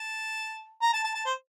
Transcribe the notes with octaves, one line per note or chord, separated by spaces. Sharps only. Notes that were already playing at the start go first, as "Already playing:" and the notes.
Already playing: A5
A#5
A5
A5
A5
C5